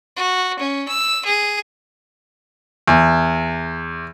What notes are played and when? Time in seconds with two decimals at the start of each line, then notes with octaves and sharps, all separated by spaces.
0.17 F#4
0.59 C#4
0.88 E6
1.26 G#4
2.88 E2